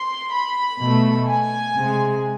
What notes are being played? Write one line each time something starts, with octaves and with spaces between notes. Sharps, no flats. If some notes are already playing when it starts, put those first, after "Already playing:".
Already playing: C6
B5
B2 A3
G#5
C3 G#3